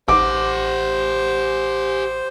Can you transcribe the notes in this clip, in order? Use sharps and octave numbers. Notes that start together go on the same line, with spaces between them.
A1 G4 C5 F#5 D6